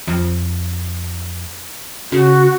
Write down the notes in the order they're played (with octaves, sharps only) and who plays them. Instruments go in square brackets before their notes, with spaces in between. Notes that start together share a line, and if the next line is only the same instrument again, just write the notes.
[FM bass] F2
[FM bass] C#3 [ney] F#4